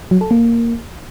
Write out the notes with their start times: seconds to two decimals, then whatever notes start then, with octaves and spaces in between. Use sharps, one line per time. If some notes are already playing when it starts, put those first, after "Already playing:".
0.11 F#3
0.21 A4
0.31 A#3